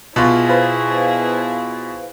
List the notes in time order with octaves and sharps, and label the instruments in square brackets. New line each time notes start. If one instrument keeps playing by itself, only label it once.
[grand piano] B2 F4 [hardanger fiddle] E4 G#4
[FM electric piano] B4 C5 F5